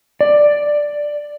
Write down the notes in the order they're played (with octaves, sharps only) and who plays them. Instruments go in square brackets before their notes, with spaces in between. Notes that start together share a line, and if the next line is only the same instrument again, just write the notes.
[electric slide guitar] D5